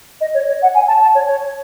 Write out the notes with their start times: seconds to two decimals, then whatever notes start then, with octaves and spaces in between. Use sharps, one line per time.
0.21 D#5
0.34 C#5
0.48 C#5
0.62 F#5
0.74 G#5
0.88 A5
1.02 A5
1.15 C#5
1.27 C#5